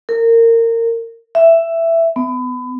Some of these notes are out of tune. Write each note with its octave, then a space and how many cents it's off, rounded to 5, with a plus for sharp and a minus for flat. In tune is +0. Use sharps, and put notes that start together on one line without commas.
A#4 -25
E5 +10
B3 +30